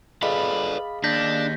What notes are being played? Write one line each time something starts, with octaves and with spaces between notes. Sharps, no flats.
G#4 A4 B4 D5 D#5 F5 B5
D#2 D4 G6 A#6 B6